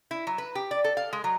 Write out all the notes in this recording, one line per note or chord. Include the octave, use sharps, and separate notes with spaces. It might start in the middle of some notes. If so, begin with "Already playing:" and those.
E4
F#3
B4
G4
D5
A4
F5
G#3
F#3